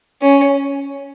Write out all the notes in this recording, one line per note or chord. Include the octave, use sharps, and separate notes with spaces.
C#4